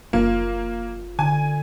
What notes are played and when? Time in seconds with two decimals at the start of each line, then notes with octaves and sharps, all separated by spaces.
0.13 F#1 A#3 F4
1.19 D3 G#5